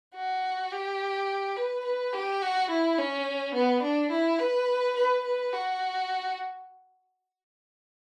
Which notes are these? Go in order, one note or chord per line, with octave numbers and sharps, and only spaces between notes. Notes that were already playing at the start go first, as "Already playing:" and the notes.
F#4
G4
B4
B4
G4
F#4
E4
C#4
B3
D4
E4
B4
B4
B4
F#4